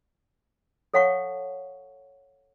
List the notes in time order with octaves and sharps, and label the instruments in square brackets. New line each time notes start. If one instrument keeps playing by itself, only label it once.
[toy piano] A4 C#5 F5 F#5 A5 C#6